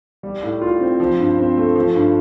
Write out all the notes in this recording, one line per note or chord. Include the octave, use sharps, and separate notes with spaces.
G3
A2
F4
C4
F3
G2
C4
A3
F3
G2